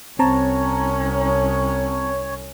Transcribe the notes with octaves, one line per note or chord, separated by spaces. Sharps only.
C2 C4 C#4 C#5 A5 A#5